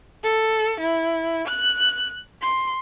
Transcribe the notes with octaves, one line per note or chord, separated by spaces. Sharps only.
A4
E4
F#6
C6